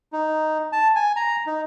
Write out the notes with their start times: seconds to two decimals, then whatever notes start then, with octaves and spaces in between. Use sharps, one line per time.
0.13 D#4
0.72 A5
0.96 G#5
1.16 A#5
1.47 D#4